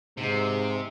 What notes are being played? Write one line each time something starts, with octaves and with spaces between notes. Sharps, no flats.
G#2 C3